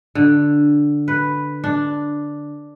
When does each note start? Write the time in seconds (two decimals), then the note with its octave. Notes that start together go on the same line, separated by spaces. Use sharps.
0.15 D3
1.08 B4
1.64 D4